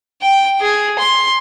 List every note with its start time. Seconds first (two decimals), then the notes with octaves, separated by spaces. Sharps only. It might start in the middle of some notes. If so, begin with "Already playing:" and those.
0.22 G5
0.61 G#4
0.99 C6